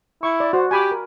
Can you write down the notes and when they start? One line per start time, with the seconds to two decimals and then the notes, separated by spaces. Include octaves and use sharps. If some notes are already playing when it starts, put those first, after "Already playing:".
0.23 E4 C#6
0.40 D5
0.53 F#4 C5
0.71 G4 G#5 B5 D6
0.91 A#4